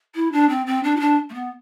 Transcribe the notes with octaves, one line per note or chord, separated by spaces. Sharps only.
E4
D4
C4
C4
D4
E4
D4
A3
B3